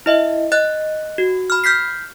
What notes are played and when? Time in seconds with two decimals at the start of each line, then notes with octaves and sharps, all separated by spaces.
0.06 E4 D#5 E5
0.52 D#5 F#6 A6
1.18 F#4
1.50 B5 F6
1.64 F6 G6 B6 C7